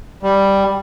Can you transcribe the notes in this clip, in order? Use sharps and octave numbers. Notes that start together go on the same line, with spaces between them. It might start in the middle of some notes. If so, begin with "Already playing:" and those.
G3